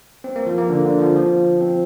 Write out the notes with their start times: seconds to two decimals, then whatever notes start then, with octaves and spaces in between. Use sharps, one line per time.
0.24 C4
0.36 A#3
0.47 F3
0.58 A#3
0.69 D3
0.85 D3
1.00 F3
1.16 F3
1.61 C4